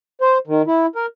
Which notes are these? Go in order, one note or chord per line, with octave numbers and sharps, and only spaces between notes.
C5
D#3
E4
A#4